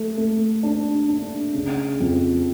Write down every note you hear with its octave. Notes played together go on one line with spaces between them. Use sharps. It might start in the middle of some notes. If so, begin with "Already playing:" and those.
Already playing: A3
A3
D4
D4
C#3
F2